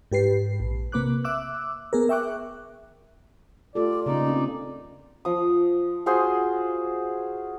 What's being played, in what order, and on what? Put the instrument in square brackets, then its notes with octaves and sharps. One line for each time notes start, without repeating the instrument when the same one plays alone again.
[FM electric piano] G#2 G4 B4 C7
A#1
C3 A#3 B4 D6 F#6
E5 D6 E6 F#6
B3 G#4 A#4
E5 G5 C#6 D6 F#6
[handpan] A3 G4 A4 [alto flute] F4 [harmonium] D5
[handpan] C#3 A#3 C#4 [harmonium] D#4 D5
[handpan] C4 D4
[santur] F3 D#6
F4 F#4 G#4 C5